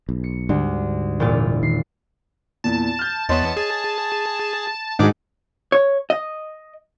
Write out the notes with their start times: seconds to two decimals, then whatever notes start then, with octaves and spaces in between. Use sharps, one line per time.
0.09 B1
0.24 C#7
0.49 D2 G#2 G3 D4
1.20 E1 A#2 F4
1.63 D#3 C7
2.64 E2 A#2 A5
2.99 F6 G6
3.29 E2 B3 C#5 D#5 A5 C6
3.57 G#4
4.99 G#2 D#3 D4 D#4 F#4 G#4 D6
5.72 C#5
6.10 D#5